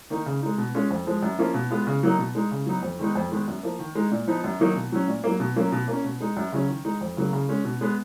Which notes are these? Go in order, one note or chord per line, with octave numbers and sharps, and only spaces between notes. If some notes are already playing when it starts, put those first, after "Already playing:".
D#3 A#3 D#4
C#3
G#3 D#4
B2
G#3 C#4 F4
F2
F3 G#3
F#2
F3 A#3 C#4 F4
B2
G#3 B3 F4
C#3
F#3 A#3 D#4
B2
G#3 D#4
C#3
F#3 B3 D#4
F2
D#3 G#3 B3 D#4
F2
D#3 G#3 B3
F#2
F3 A#3
D#3
G#3 D#4
A#2
F3 B3 D#4
F#2
D#3 F#3 A#3 D#4
B2
F#3 C#4
A#2
F#3 A#3
B2
F#3 A#3 C#4 F4
B2
A#3 C#4
B2
G#3 D#4
F#2
C#3 F#3 C#4
D#3
G#3 D#4
F2
C#3 F#3 A#3
C#3
G#3 C#4
B2
G#3 B3